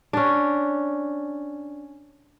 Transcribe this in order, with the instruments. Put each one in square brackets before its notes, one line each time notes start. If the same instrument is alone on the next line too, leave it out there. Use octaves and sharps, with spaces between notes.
[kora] C#4 D4